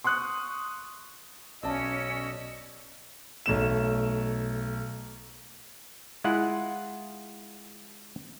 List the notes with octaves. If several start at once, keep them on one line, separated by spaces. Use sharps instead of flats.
C6 C#6 D#6 F#6
B1 C#4 D5 D#5 A5 E6
B1 A3 E7
G#3 E4 F4 F#5